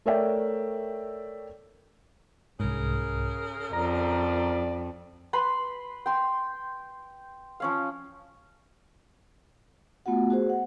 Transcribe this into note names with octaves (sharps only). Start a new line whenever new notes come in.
A3 A#4 C#5 D5 E5 G5
C2 G#2 C#3 G#4 A#4
F2 D5 A#5
B4 B5 C6
G5 C6
F3 C#4 F5
A3 B3 F4 F#4 F#5
F#4 G#4 C5
F#5